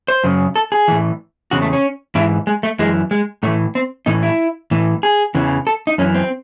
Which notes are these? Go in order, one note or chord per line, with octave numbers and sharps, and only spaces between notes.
C5
F#2 C#3
A4
G#4
A2 E3
E2 C#3 F#4
A3
C#4
G#2 E3 E4
G#3
A3
F#2 E3 G#3
G#3
A2 E3 A3
C4
A2 E3 D#4
E4
A2 E3
G#4
E2 C#3 E3
A4
D#4
F#2 E3 C#4
C4